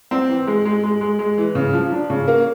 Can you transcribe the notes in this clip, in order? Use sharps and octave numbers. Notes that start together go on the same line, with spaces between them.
C4
E3
G#3
G#3
G#3
G#3
G#3
E3
C#3
F3
D4
C#3
A#3